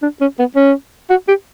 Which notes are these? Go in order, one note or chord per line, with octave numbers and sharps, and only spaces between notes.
D4
C#4
B3
C#4
F#4
G4